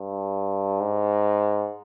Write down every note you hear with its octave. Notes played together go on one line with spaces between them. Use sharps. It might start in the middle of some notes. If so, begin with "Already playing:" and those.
Already playing: G2
G#2